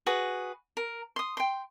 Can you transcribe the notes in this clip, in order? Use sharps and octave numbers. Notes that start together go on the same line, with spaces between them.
F#4 G#4 B4
A#4
C6 D#6
G5 C6